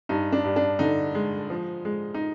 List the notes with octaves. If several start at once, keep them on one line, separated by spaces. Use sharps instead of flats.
G2 D#4
D4
G2
D4
D3 D#4
G#3
F3
G#3
D#4